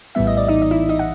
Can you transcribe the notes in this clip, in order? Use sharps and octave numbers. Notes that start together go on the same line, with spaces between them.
A#1 A2 E3 G3 B3 E5
D#5
D5
D#4 D#5
D#5
E4 E5
D#4 D#5
F#5